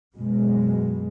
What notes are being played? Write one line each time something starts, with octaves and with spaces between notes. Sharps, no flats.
F#2 B2 G#3